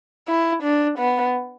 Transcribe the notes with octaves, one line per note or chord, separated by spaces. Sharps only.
E4
D4
B3